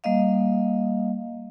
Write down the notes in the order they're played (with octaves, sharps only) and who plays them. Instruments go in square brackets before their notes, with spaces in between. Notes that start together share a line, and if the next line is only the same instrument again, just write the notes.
[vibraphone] G3 A#3 D#5 F5